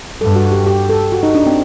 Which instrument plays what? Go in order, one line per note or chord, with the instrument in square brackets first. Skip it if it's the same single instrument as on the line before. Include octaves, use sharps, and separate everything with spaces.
[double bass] G2 [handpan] A4
[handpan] F#4
G4
G4
A4
F#4
D#4
D4
C4